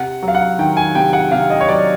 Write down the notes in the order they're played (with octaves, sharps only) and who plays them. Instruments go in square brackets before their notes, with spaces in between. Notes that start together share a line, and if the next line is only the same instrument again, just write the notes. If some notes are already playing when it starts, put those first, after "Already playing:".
Already playing: [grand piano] C3 F#5
F#3
F5
F#5
D#3 G5
G#5
C3 G5
F#5
C3 F5
D#5
C#5
F#3 D5